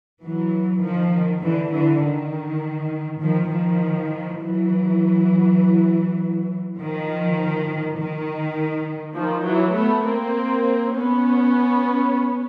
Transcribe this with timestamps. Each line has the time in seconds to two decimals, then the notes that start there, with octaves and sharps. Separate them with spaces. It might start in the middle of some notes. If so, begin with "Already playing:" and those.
0.21 E3 F#3
0.82 D#3 F3
1.11 D#3
1.41 D3 E3
1.70 D3 E3
2.01 D#3
3.20 D#3 F3
3.49 D#3 F3
4.39 E3 F#3
6.78 D#3 F3
7.97 D#3
9.16 D#3 F3
9.45 E3 F#3
9.75 A3 B3
10.06 A#3 C4
10.96 B3 C#4